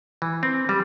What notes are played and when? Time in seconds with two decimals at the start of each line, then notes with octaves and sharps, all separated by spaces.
0.22 E3
0.43 C4
0.69 G3